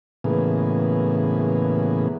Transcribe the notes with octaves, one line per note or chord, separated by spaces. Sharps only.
A2 C#3 E3 A#3 B3 G#4